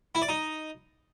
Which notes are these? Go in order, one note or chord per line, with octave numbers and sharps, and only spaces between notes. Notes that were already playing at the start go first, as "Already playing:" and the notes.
E4
D5
D#4